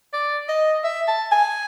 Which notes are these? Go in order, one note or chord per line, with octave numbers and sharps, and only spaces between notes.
D5
D#5
E5
A5
G#5